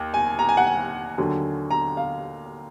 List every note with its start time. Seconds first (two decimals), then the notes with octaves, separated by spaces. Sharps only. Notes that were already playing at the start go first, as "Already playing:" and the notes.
Already playing: D#2
0.14 G#5
0.39 A#5
0.49 G#5
0.57 F#5
0.67 G#5
1.18 D#2 D3 F#3
1.71 A#5
1.97 F5